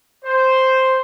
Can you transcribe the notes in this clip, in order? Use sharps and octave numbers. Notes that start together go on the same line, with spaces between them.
C5